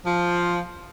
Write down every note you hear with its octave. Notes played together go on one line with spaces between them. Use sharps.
F3